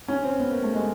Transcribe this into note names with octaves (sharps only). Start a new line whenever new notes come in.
C#4
C4
B3
A#3
A3
G#3